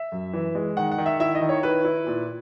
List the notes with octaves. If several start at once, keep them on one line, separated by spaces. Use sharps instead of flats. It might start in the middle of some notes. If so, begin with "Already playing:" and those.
Already playing: E5
F#2
E3
G#3
D#3 F#5
F#5
D#3
E5
E4 E5
D#5
D#3
C#5
E4 B4
E4
A#2